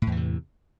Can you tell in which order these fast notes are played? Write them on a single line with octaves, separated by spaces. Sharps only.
A2 E2 E3 C3